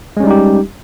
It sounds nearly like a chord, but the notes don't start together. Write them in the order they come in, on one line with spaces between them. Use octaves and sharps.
G#3 C#4 G3 D#4 G4